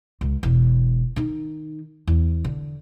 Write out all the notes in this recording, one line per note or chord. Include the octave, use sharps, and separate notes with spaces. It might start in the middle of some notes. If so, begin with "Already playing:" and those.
C#2
E1
D#3 D#4
E2
D3